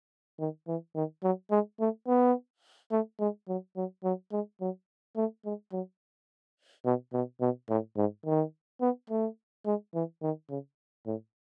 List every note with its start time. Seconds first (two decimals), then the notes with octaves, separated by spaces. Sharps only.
0.40 D#3
0.68 E3
0.95 D#3
1.23 F#3
1.51 G#3
1.80 A3
2.07 B3
2.91 A3
3.20 G#3
3.48 F#3
3.76 F#3
4.04 F#3
4.32 G#3
4.61 F#3
5.17 A3
5.45 G#3
5.72 F#3
6.85 B2
7.13 B2
7.41 B2
7.69 A2
7.97 G#2
8.26 D#3
8.81 B3
9.10 A3
9.66 G#3
9.94 E3
10.22 D#3
10.49 C#3
11.06 A2